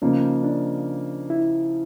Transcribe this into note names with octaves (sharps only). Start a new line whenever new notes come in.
C#3 F3 A#3 C#4 D#4
D4
E4